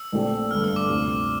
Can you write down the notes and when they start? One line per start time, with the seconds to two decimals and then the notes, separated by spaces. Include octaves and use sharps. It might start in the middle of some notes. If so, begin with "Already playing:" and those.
Already playing: E6
0.12 A#1 A#2 A3 C4 G4
0.51 G1 G2 D3 A3 D4 F6
0.64 E6
0.76 D6
0.89 D2 C3 G3 C4 F4